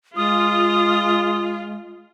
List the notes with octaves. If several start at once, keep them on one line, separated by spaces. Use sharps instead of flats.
G#3 F4 D#6